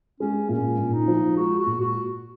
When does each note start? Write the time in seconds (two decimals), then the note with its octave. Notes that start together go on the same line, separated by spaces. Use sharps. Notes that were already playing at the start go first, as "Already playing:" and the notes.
0.20 G#3 C#4
0.49 A#2 C#4
0.78 A#2
0.93 D#4
1.08 F3
1.36 G#3 F#4
1.59 F#4
1.66 A#2
1.81 F#4